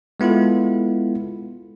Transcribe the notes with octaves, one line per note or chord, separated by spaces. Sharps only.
G#3 B3 E4 F4 A4